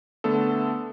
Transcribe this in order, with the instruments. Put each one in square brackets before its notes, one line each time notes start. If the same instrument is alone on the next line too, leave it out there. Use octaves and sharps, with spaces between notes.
[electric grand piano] D3 A3 B3 A4